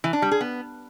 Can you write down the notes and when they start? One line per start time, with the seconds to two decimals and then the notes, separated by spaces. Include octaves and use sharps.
0.04 E3
0.13 D4
0.22 G3
0.31 G#4
0.41 B3